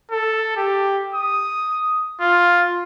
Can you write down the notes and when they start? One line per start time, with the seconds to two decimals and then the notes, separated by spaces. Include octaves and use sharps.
0.12 A4
0.57 G4
1.15 D#6
2.21 F4